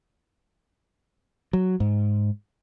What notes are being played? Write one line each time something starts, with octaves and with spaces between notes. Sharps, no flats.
F#3
G#2